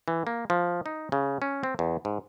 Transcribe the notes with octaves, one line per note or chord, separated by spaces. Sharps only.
E3
A#3
F3
D#4
C#3
C#4
C4
E2
G#2